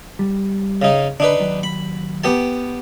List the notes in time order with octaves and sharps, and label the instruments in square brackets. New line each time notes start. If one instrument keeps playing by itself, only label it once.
[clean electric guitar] G3
[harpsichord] C#3 D#4
[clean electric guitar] D3 [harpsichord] D4 D#4 B4
[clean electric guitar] D#2 F#3
[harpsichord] B5
B3 G4 A5